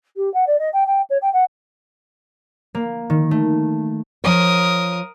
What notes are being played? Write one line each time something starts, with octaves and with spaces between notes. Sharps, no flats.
G4
F#5
D5
D#5
G5
G5
C#5
G5
F#5
A#3
D#3
A3
F3 A#4 C#5 D#6